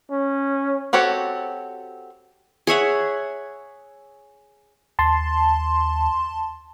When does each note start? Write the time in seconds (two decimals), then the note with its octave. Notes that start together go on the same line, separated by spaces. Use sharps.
0.11 C#4
0.93 C4 F#4 G4 A4 C#5
2.67 G#4 C#5 E5 F#5
4.99 D#2 A5 C6